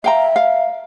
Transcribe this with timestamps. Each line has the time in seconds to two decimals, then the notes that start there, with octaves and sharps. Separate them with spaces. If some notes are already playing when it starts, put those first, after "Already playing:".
0.04 E5 F5 G5 A#5
0.36 F5